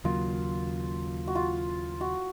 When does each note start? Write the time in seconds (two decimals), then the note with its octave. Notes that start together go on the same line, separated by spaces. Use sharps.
0.04 D#2 C#3 F#3 A#3 F4
1.27 F#4
1.35 F4
2.01 F#4